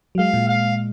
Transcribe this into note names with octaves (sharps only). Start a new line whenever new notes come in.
F#3
G#3 F5
A#2
F5